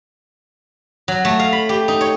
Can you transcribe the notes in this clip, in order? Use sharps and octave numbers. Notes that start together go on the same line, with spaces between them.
F#3
A3
F5
B5
G4
D#4
C#5